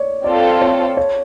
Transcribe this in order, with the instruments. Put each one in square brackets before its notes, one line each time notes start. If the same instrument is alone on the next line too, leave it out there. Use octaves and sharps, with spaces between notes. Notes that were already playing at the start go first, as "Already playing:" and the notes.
Already playing: [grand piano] C#5 D5
[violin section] C4 F4 A4 [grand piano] D5
[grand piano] C#5
C#5